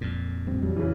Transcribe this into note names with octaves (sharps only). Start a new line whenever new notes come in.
F2 A#2
D1 G2 C4
E2 F#3 G3
C#3 E3